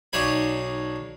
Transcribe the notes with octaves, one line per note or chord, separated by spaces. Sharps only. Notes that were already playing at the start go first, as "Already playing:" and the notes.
B1 D4 D#4 C#5 F5 B5